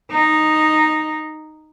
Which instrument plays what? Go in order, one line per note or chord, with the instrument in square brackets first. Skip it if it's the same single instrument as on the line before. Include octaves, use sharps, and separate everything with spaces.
[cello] D#4